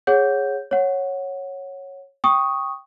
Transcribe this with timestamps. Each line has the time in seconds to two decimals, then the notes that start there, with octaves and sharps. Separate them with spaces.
0.07 G#4 C#5 F#5 G6
0.71 C#5 F#5
2.24 G5 C#6 D#6